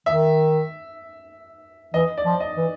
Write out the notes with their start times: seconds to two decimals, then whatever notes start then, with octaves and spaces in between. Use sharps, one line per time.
0.06 D#3 E5
1.94 E3 D#5
2.17 D5
2.25 F3
2.40 D#5
2.57 E3